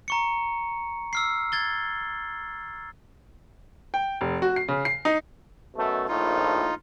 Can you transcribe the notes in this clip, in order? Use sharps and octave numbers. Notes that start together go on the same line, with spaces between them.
A#5 C#6 C#7
E6 F6 C7
G#6 A6 G7
G5
F1
F#4
C7
C#3
C7
D#4
F#2 B2 A3
A#1 A2 D#4 F4